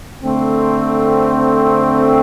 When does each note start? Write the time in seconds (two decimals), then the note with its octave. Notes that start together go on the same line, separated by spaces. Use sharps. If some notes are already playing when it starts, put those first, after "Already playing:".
0.22 D3 A3 C4